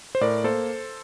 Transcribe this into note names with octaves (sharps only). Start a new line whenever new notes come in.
C5
A2 A#4 D5
A#3 A4 C5